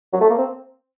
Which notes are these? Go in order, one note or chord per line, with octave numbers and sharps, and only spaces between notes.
F#3
A3
A#3
C4